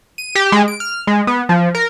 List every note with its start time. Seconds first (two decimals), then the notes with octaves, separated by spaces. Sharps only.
0.18 D#7
0.35 G4
0.52 G#3
0.68 D7
0.80 F6
1.07 G#3
1.27 B3
1.49 F3
1.75 A#4